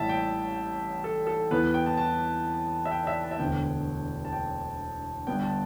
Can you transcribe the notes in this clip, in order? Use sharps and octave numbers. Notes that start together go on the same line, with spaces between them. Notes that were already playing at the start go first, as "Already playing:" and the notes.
Already playing: A1 A2 G3 E5 A5
G5
A4
A4
E2 E3 B3 B4
G5
A5
A5
E5
G5
D5
E5
A5
E5
E1 D2 D3 B3 G5
A5
G5
G1 G2 G3 B3 G5
A5